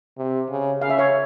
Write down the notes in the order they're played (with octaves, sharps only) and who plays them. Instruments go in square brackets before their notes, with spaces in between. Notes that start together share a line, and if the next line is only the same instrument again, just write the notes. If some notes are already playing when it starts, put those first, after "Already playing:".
[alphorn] C3
C#3
[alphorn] C#3 [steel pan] F5
[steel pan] E5
C#5 F5